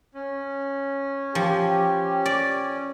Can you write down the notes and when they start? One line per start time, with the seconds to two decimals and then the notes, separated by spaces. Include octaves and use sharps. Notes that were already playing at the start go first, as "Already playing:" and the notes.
0.15 C#4
1.35 F3 G4
2.26 D5